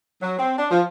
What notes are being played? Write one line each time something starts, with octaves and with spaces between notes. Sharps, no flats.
F#3
C4
D4
F3